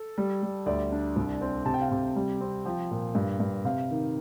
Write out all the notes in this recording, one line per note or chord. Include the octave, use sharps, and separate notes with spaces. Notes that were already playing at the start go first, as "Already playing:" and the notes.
Already playing: A4
G3
G3
D2 D5
D4
C2
C4
C3 A5
G5
F5
C3 G5
G3
C4
F3 G5
A#2
G2
G2
C3 F5
D#3